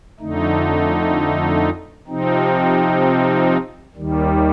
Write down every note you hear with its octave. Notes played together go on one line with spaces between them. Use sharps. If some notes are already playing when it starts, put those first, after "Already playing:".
F2 D3 A3 D#4
C3 F3 C4 D#4
D#2 D#3 G3